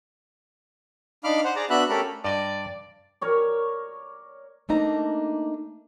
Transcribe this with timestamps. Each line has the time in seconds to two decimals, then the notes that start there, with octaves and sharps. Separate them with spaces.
1.24 D4 D#4 F5 B5 D6 F6
1.44 C5 F#5
1.56 G#4 D5 A#5
1.70 B3 D4 F#4 E5 B5 F#6
1.89 A3 C#4 G4 A4 A#4 B5
2.25 G2 D5 D#5
3.21 A#4 C#5 D5
4.69 A3 A#3 D4 D#4 A#5